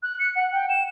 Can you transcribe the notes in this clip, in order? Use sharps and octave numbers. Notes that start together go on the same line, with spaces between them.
F#6
C#7
F#5
G5
E7